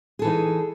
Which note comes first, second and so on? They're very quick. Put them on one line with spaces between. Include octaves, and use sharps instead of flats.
G#4 A4 E3 D#4